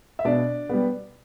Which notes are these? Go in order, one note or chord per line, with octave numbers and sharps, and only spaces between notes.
E5
B2 D4 D5
G3 B3